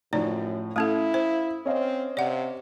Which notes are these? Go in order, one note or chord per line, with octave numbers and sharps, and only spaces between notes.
F#2 A2 F3 D#4 D5
A3 C#4 E4 A4 F5 D#6
C5
C4 C#4 D#5 F5
C3 D5 F#5